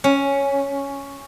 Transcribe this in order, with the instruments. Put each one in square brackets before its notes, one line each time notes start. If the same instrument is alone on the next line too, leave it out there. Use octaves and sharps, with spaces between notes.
[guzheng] C#4